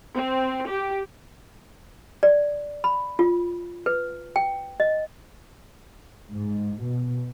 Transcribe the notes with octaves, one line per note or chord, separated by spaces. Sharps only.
C4
G4
D5
B5
F4
B4
G5
D#5
G#2
B2